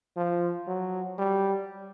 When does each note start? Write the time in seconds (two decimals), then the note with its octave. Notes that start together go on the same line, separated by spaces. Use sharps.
0.17 F3
0.68 F#3
1.18 G3